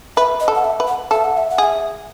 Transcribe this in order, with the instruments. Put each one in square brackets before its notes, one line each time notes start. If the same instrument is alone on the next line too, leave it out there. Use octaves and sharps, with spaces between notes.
[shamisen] B4 [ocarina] E5
[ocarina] D#5
[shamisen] A4
[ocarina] F#5
E5
[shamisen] B4
[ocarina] F#5
[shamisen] A4 [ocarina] E5
[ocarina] F#5
E5
F#5
[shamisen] G#4
[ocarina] E5